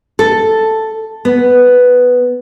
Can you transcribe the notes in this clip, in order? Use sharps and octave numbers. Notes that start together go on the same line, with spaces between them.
A4
B3